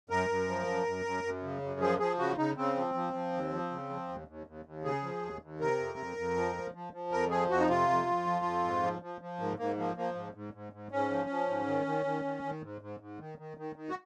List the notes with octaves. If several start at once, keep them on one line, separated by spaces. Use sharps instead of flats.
F#2 A#4
F#2
F3
F#2
F#2
F#2
F#2
C#3
F#2
F3 G#4
F3 G#4
C#3 F#4
C#3 D#4
C#3 C4
F3
F3
F3
D#2
F3
C#3
F3
D#2
D#2
D#2
D#2
C#3 G#4
F3
D#2
D#2
C3 A#4
F2
F2
F2
F3
F3
F3
F3
F2 A#4
F3 G#4
F2 F#4
D#4
C3 F4
F2
F2
F3
F2
G#2
F3
F3
F3
G#2 A#3
G#2 A#3
F3 A#3
F3 A#3
G#2
G#2
G#2
G#2
G#2 C#4
F3
F3
G#2
D#3
D#3
D#3
D#3
D#3
G#2
G#2
G#2
D#3
D#3
D#3
D#3
F#4